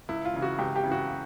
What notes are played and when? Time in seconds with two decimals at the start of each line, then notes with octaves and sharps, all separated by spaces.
0.09 C#2 E4
0.25 F4
0.33 C#3 E3
0.42 F#4
0.59 C#2 G4
0.76 G4
0.84 C#3 E3
0.92 F#4